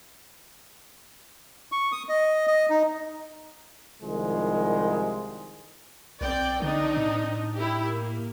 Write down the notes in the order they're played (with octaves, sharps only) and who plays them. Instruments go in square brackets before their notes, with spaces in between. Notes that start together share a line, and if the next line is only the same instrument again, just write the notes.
[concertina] C#6
D#6
D#5
D#5
D#4
[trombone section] C2 D#3 F3 G#3
[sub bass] B1 [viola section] C4 D5 G5
[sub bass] D3 [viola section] C4 D4 D#4
[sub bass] A2
[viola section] E4 G4
A#3